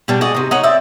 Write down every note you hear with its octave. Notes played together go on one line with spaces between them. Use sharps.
B2 G3 D4
F#4 G#4 D5 D#5
C3 D#4
D#4 C#5 F#5
C4 D5 E5